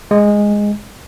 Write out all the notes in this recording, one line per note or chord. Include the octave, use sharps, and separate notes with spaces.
G#3